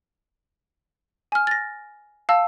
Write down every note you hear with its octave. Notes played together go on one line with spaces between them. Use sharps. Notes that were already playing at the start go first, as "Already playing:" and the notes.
G#5 F6
A6 A#6
F5 A5 E6